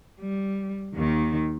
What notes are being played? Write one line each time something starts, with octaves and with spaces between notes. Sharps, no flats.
G3
D#2 D#3